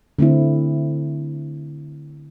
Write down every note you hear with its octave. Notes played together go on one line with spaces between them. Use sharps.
D3 A3 C4 E4